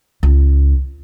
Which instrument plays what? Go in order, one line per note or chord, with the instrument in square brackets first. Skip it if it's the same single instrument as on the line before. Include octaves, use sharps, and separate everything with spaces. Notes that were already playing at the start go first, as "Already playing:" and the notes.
[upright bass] C#2